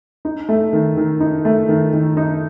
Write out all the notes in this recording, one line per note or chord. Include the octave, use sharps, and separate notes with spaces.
D#4
A3
D#3
D#3
D#4
A3
D#3
D#3
D#4